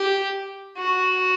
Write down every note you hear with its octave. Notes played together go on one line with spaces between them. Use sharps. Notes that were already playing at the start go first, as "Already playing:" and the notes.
Already playing: G4
F#4